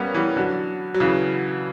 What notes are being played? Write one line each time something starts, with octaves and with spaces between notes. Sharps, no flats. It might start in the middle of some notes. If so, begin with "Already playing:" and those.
Already playing: G3 A#3 B3 C#4
E3 G3
D3 F#3
F#3
C#3 E3